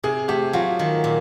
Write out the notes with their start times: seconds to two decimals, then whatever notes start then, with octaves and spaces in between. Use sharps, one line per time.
0.03 C3 G#4
0.28 A3 G4
0.53 F#3 F4
0.79 D#3
1.04 A#2